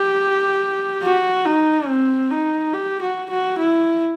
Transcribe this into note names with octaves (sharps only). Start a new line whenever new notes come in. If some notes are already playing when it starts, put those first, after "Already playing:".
Already playing: G4
F#4
D#4
C4
D#4
G4
F#4
F#4
E4